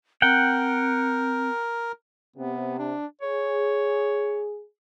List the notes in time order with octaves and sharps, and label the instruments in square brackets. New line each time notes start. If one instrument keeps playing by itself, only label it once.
[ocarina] C4 [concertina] A#4 [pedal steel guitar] F#5 G5
[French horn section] C3 [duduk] B3
[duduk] D4
[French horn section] G#4 [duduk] C#5